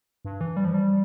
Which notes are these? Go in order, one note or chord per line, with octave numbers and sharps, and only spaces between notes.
G2
E3
G3
F3
G3